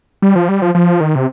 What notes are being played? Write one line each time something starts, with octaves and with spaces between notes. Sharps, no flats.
G3
F3
G3
F3
F3
D#3
C3